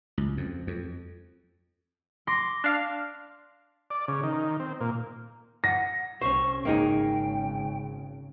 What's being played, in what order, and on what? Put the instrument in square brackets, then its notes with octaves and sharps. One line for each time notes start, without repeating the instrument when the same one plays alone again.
[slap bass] C#2
F2
F2
[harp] C6 D6 A#6
[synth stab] D4 F5
[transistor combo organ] D5
C#3
D#3
C4
A#2
[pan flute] F#5 [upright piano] A#6
[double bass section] C2 [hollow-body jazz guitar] C#4 C5 [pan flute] C#6
[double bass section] G#1 C#3 [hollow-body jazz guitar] A#3 D#4 G#4 [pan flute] G5